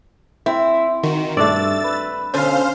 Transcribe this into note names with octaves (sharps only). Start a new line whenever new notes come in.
C4 E4
D#3 F#4
G2 A3 D4 D5 E6 A6
B4
B2 D3 C#4 C5 F5